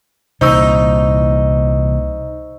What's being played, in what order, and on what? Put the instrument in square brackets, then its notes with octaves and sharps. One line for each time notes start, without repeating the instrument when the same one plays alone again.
[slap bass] C2 A#2 E3 [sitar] D#4 [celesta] C5 C#6 E6